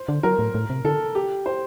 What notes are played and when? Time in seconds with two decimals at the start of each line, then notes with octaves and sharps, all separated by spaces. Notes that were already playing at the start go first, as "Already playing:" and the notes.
Already playing: C5
0.09 D3
0.23 F#3 A#4
0.39 A2
0.55 A2
0.70 C3
0.85 D3 A4
1.15 G4
1.46 C5